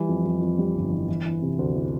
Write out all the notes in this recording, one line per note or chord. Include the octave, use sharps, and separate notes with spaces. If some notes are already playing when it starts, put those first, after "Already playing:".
Already playing: E3 G3
F2
F2
F2
G3
G1
E3
E3
E3
C3
D2
E3